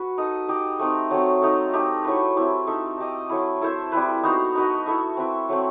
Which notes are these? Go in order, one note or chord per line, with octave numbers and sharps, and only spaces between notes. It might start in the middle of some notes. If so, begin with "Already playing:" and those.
Already playing: F#4 B4
D#4 A4 D#5
D#4 G4 D#5
A3 C4 D#4
F#3 A3 C4
A3 D#4 A4
A3 D#4 G4
F#3 A3 E4 B4
C4 E4 G4
D#4 A4 E5
D#4 G4 D#5
F#3 A3 E4
E4 A4 C5 E5
G3 C4 E4 B4
B3 D#4 F#4 C5
D#4 F#4 B4 D#5
E4 A4 E5
C4 E4 B4
F#3 A3 C4